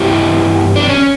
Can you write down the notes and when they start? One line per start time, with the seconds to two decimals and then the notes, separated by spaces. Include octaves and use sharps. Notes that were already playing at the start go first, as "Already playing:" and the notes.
Already playing: G2 E3 B3 E4 G4
0.76 D4
0.89 C#4